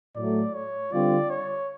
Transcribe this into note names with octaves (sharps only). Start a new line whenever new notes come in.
A2 F#3 A3 D5
C#5
D3 G3 C4 F4 D5
C#5